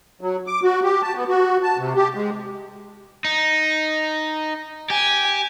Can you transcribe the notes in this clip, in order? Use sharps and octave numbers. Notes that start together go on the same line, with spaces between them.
F#3
D6
F#4
G4
A5
B3
F#4
A5
C3
G4
G#3
D#4
G4 G#5